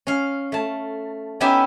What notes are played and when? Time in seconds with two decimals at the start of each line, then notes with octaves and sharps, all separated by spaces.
0.07 C#4 F5
0.52 A3 A5
1.40 B3 C#4 D#4 E4 G4 E5